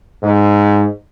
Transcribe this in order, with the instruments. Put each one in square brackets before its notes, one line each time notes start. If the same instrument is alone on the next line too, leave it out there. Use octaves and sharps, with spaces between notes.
[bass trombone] G#2